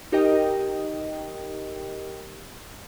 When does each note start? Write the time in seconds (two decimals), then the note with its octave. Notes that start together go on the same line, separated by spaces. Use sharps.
0.12 D#4 G4 A#4 D#5 G5